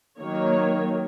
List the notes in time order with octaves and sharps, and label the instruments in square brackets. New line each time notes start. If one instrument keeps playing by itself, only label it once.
[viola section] D#3 F#3 A#3 C#5